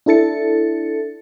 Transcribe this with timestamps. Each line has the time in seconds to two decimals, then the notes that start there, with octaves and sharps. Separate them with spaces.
0.06 D4 E4 A4 A6 C#7